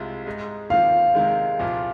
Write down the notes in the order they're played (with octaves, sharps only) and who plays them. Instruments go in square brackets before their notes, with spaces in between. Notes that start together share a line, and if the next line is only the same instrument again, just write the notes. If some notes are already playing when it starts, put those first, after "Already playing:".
Already playing: [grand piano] C2 C3 G#3 F4
G#2 G#3 D#4
[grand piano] D#2 D#3 C4 F4 [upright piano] F5
[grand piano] C3 D#3 G#3
C2 A#2 F3